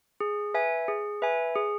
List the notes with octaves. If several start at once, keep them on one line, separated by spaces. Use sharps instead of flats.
G#4
B4 E5 G#5
G#4
B4 E5 G#5
G#4